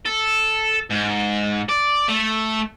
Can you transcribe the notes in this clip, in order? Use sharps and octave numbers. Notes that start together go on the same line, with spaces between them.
A4
G#2
D5
A3